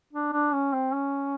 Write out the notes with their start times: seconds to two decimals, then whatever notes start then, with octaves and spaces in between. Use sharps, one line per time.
0.13 D4
0.33 D4
0.53 C#4
0.73 C4
0.93 C#4